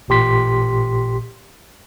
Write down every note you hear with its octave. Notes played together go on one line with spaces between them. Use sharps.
A1 A#2 G4 C6 B6